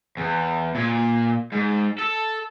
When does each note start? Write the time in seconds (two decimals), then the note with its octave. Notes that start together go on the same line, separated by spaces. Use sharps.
0.17 E2
0.75 A#2
1.52 G#2
1.99 A4